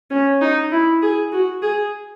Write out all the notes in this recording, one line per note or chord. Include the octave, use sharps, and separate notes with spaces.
C#4
D#4
E4
G#4
F#4
G#4